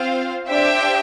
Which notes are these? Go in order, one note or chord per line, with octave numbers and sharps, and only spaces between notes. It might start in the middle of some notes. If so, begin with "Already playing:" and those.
Already playing: C4 F4 C5 F5
D4 G4 C5 E5 G5